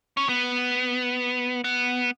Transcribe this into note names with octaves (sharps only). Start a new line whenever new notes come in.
C#4
B3
B3